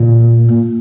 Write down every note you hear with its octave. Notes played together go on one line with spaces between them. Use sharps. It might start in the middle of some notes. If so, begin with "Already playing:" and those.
Already playing: A#2